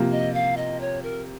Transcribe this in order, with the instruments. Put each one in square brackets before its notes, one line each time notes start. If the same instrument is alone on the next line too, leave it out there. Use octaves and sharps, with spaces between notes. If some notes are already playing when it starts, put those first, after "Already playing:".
Already playing: [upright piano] C3 F3 A#3
[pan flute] D#5
F5
D#5
C#5
A#4